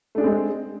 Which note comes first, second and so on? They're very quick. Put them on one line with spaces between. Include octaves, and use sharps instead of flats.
A3 D4 G#4 C4 G#3